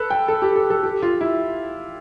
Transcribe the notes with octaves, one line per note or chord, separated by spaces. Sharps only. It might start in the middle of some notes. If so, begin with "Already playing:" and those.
Already playing: A4 B4
G5
A4
G4
A4
A4
G4
F4
E4